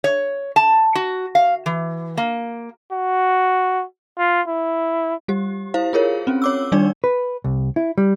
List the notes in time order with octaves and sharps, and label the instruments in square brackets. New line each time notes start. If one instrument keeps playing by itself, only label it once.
[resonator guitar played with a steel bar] C#5
A5
F#4
F5
E3
A#3
[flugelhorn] F#4
F4
E4
[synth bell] G3 G4
E4 C5 F5
F4 G#4 A#4 C#5
C4 C#4
C#5 D6 E6
D#3 G3 D4 D#4 D5
[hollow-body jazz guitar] B4
C2
E4
G3